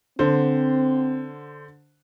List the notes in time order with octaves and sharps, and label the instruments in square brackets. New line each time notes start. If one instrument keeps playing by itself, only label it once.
[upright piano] D3 C5 [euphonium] C4